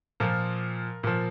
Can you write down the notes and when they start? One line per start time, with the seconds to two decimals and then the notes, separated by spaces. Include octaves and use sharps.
0.20 A#2 F3 A#4
1.03 A#2 F3